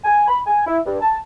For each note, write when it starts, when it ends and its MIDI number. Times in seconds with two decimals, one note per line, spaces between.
0.04 0.24 80
0.28 0.40 83
0.47 0.61 80
0.67 0.78 64
0.86 0.96 43
1.01 1.17 81